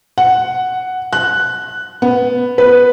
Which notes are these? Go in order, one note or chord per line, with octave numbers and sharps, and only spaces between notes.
F#5
F#6
B3
B4